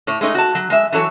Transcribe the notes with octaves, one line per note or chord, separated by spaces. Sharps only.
A2 C#5
G#3 A3 D#4 C#5
F#4 A5
F#3
G#3 E5
E3 F#3 A4 C#5